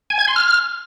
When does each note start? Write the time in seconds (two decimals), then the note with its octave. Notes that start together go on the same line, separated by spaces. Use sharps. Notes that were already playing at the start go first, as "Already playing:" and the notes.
0.10 G#5
0.19 G#6
0.27 C6
0.36 F6